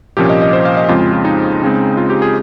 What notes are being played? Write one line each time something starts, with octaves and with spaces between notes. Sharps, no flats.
C2 A#2 F3 A#3 C#4 G4
D#5
D#5
C5
F5
D#5
F2 C#3 G#3 C4 F4
F4
F4
D#4
C#2 C#3 G#3 C4
F4
G4
G#4